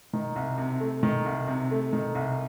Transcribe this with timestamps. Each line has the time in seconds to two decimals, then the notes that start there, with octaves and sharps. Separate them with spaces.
0.13 D#3
0.36 C2
0.58 C3
0.80 A3
1.03 D#3
1.26 C2
1.47 C3
1.71 A3
1.93 D#3
2.15 C2